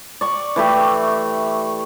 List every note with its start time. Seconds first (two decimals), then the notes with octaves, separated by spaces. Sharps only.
0.21 D5 C#6
0.56 E3 A3 G4